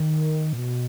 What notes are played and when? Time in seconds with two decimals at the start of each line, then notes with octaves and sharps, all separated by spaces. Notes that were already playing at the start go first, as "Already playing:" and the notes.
Already playing: D#3
0.53 A#2
0.58 B2